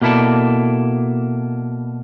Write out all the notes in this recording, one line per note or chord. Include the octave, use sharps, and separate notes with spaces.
B2 A#3 E4 G4 A4 D5